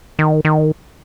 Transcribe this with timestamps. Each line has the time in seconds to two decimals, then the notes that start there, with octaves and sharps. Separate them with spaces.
0.19 D#3
0.45 D#3